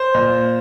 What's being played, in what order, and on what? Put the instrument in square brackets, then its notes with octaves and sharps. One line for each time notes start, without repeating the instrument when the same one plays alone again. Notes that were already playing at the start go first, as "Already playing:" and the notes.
Already playing: [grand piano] C5
A#2